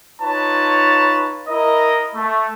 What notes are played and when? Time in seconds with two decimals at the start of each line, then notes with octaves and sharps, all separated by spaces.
0.21 D#4 F4 B4 C#5 A5
1.48 E4 A#4 D#5
2.15 A3